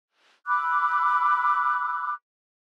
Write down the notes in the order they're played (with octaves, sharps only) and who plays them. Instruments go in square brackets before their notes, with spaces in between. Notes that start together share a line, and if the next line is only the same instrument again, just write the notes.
[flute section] B5 D6 E6 F#6